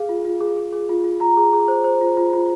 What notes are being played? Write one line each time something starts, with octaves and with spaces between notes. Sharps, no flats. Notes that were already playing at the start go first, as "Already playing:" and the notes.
Already playing: G#4 F5
F4
F4
G#4
G#4
G#4
F4
F4
F4 A#5
G#4
G#4
C5
C5
F4
F4
F4